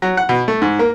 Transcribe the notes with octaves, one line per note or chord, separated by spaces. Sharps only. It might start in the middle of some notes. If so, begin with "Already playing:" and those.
F#3
F#5
B2
A3
G#2
A#3